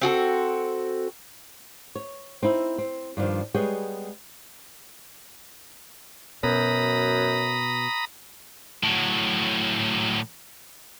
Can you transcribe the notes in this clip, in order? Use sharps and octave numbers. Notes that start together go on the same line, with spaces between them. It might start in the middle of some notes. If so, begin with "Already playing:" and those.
C4 F#4 G#4 A4
C#5
C4 D#4 E4
C4
G2 D#3 F3 D4
G3 G#3 B3 G#4 C#5 G5
F#2 B2 A#5 B5 D#6
A2 F#3